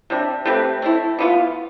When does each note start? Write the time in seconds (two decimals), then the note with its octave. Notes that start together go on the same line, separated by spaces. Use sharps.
0.10 C3 G3 D4
0.45 A3 C4 G4 B4
0.82 A3 C4 E4
1.19 E3 B3 F4